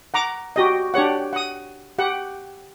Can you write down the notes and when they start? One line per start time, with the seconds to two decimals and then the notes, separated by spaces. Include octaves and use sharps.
0.14 F#5 A#5 D6
0.56 F#4 G4 D#5
0.94 D4 G4 C#5 F#5
1.33 F#5 D#6
1.98 G4 F#5